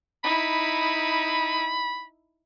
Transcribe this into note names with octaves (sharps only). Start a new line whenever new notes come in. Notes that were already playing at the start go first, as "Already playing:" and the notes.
D#4 E4 B5